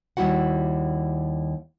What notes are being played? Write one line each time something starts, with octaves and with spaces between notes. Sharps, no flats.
D#2 C3 G3 E4 F#4 F#5